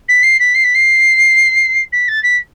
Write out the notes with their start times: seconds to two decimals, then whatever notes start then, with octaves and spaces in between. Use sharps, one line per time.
0.08 B6
0.23 C7
0.39 B6
0.55 C7
0.64 B6
0.75 C7
1.92 B6
2.08 A6
2.23 B6